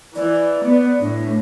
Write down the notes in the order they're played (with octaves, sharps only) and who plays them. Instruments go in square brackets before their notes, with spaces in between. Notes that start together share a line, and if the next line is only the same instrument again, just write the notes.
[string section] E3 [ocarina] D5
[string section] B3
[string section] A2 [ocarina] D4